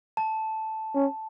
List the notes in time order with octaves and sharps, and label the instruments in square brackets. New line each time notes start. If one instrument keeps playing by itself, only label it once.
[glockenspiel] A5
[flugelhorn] C#4